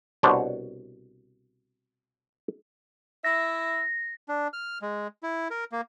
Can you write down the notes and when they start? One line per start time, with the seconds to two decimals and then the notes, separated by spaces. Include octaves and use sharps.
0.23 C2 B2 D4 C5 C#5 A5
3.24 E4 E5 A#6
4.28 D4
4.53 F6
4.82 G#3
5.23 E4
5.51 A#4
5.72 A#3